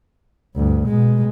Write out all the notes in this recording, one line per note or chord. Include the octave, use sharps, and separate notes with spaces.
D2 G2
B2 G#3